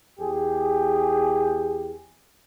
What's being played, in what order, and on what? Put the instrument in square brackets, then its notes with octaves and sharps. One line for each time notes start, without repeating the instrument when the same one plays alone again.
[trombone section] E2 G4 G#4